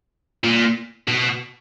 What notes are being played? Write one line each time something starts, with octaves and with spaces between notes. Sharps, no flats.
A#2
B2